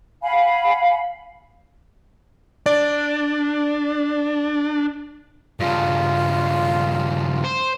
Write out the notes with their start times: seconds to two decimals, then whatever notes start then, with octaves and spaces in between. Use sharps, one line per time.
0.22 F5 F#5 G#5 B5
2.66 D4 D5
5.60 G2 C#3 F4
7.44 C5